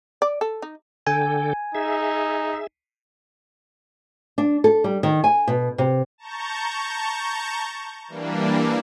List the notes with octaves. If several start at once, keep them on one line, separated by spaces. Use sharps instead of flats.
D5
A4
D#4
D3 A4 G5 G#5
D#4 G#4 E5
D4
A4
G3
D#3
G#5
B2
C3
A5 A#5 C#6 G6
E3 G3 A#3 D4